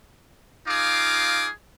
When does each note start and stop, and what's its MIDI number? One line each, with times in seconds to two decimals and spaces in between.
0.68 1.48 63
0.68 1.48 65
0.68 1.48 68
0.68 1.48 77
0.68 1.48 86